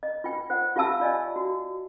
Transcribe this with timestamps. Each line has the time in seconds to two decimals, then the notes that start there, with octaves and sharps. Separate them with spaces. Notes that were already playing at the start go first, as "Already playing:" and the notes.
0.03 D#5
0.24 F4 G5
0.50 C5 F#5
0.76 F4 G4 E5 F5 A5 E6
1.00 F4 D5 D#5 G#5
1.36 F#4